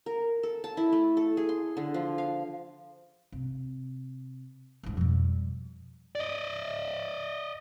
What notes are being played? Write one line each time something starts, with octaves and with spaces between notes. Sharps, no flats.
A#4
A4
A5
E4
A3
A4
G#4
C6
D3
F3
F5
C3
D#1 G#2
F2 B2 G3
D5 D#5